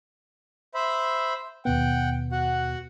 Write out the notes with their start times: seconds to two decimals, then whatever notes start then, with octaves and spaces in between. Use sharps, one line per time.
0.74 C5 E5 B5
1.65 D#2 B2 B3 F#5 G5
2.32 F#4 F#5